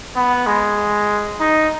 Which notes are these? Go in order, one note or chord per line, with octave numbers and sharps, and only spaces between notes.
B3
G#3
D#4